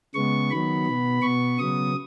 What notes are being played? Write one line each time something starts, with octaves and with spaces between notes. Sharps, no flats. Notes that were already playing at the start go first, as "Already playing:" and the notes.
C#3 G#3 B3 C#6
D#3 F#3 B3 B5
B2 B3
B2 B3 C#6
C#3 F#3 B3 D#6